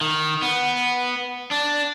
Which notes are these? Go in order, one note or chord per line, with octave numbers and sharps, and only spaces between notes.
D#3
B3
D4